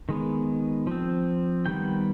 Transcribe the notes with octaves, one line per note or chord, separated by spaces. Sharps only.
D#3 G#3 B3
F3 C4
D#3 G3 B3 G5